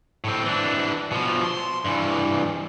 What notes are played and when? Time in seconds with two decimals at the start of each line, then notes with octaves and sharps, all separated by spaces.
0.24 A2 C4
0.45 E3 D4
1.11 B2 F3
1.44 C6
1.85 G2 E3